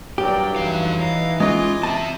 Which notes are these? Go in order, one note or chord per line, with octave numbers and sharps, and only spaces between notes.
G2 F#3 G4 A#4 D5 G5
F2 E3 D#4 F5
F5 A#5
G#3 C#4 F4 D#5 G#5 D6
C4 E5 A5